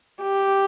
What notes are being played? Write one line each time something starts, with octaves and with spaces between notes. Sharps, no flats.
G4